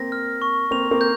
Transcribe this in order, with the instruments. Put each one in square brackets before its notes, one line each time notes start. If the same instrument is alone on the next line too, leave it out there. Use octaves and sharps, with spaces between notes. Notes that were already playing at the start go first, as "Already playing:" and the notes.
Already playing: [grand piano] A#3 C4 [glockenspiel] A#6
[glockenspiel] F6
C#6
[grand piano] A#3 C4 [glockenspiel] F7
[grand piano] A#3 C4
[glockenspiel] G6